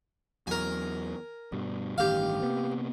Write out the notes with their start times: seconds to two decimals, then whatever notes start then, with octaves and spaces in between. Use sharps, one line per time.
0.47 E2 F#3 A#4 G#5
1.52 G2 B2 G3
1.98 A1 G2 D#3 G4 F5
2.43 C3 A#3 B3